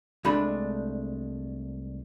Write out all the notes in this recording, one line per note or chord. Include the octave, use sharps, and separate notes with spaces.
C2 G#3 A3 D4 B5